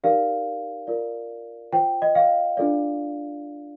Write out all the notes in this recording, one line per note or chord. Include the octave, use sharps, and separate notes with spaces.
D#4 G4 A#4 D5 F5
F4 A#4 D5
F4 C5 G5
D#5
F5
D4 F4 A4 D5